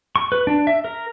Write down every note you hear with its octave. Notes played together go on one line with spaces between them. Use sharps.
C#6
B4
D4
E5
A#4